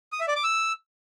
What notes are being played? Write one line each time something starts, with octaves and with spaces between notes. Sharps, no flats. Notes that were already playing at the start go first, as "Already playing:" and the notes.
D#6
E5
D5
D6
E6